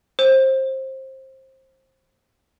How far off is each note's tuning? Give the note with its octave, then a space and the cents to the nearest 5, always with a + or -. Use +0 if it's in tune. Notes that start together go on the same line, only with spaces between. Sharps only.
C5 +20